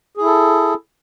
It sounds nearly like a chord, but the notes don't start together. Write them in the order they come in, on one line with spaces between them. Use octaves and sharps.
G#4 E4 A4